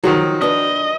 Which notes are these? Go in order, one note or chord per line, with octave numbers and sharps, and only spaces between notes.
D#3 F3 F#3 F#4
D4 B4 D#5